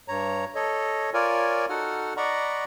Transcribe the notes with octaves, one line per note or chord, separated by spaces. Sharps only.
G2 C#5 A#5
A4 C#5 D#5
F4 A#4 C#5 D5 G#5
D#4 F#4 A4 F#5 F6
D5 D#5 F#5 A#5 B5 C#6